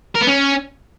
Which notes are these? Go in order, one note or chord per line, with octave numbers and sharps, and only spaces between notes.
A#4
B3
C#4